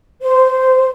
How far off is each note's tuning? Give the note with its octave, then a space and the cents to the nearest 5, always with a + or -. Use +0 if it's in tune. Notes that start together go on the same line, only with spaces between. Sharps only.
C5 -15